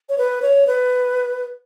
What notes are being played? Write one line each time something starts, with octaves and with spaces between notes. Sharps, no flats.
C#5
B4
C#5
B4